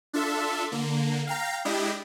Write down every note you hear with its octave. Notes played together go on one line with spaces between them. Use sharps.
D4 F4 A4 E5
D3 A#3
F5 G5 A#5
G#3 D4 E4 G4 D#5